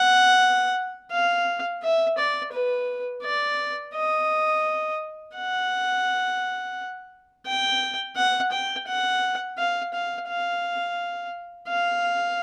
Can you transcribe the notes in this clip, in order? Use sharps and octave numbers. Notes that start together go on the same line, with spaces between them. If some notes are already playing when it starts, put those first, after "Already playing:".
Already playing: F#5
F5
E5
D5
B4
D5
D#5
F#5
G5
F#5
G5
F#5
F5
F5
F5
F5